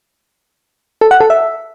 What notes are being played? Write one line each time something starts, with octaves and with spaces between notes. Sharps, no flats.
A4
F#5
A4
E5